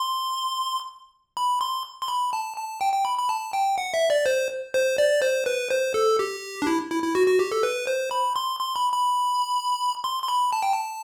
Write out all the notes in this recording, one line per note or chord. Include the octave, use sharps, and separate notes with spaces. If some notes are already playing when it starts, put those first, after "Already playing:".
Already playing: C6
B5
C6
C6
B5
A5
A5
G5
G5
B5
B5
A5
G5
F#5
E5
D5
C5
C5
D5
C5
B4
C5
A4
G4
D4
E4
E4
E4
F#4
F#4
G4
A4
B4
C5
B5
C6
C6
B5
B5
C6
C6
B5
A5
G5
A5